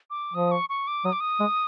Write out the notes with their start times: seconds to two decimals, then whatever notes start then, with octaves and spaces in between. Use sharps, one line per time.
0.10 D6
0.34 F3 D#6
0.52 C#6
0.69 C#6
0.87 D6
1.05 F#3 D#6
1.12 D6
1.20 D#6
1.40 G#3